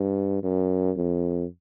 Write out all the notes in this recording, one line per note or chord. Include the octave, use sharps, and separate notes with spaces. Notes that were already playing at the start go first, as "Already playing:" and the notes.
Already playing: G2
F#2
F2